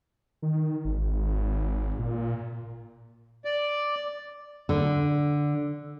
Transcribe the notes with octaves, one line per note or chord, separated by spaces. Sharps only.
D#3
G#1
A#2
D5
D3